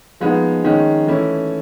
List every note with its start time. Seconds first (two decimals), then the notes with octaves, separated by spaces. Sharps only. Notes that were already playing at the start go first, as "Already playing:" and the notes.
0.20 F3 G#3 B3 D#4
0.64 D#3 G#3 C#4
1.06 E3 A3 C#4 E4